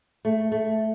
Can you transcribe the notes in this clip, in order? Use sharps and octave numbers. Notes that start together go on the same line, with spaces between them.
A3
A3